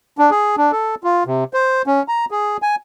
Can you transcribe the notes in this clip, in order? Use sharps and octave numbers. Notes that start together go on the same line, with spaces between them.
D4
G#4
D4
A4
F4
C3
C5
C#4
A#5
G#4
G#5